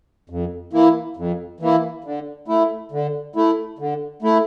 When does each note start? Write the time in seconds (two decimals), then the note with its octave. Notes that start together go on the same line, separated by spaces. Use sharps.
0.30 F2
0.73 E3 A#3 E4
1.17 F2
1.60 E3 A#3 E4
2.04 D3
2.48 A3 E4
2.92 D3
3.36 A3 E4
3.79 D3
4.22 A3 E4